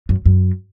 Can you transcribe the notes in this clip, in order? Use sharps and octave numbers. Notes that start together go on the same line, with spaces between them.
F#2
F#2